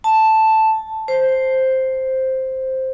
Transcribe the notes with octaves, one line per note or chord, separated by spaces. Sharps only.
A5
C5